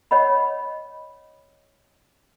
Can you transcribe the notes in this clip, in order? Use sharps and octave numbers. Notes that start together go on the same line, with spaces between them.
C#5 D#5 F#5 B5